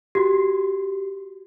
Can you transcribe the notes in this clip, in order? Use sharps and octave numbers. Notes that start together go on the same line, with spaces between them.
F#4 G4